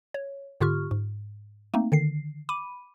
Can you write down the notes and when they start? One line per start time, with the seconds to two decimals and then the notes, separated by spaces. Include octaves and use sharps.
0.14 C#5
0.61 G#2 D3 F4 G4 C#6 F6
0.91 G#2
1.74 A3 A#3 C4 D#4
1.92 D3 D#3 C7
2.49 B5 D6 D#7